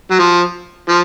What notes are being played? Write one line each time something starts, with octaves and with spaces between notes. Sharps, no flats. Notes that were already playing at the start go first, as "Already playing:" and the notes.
F#3
F3
F3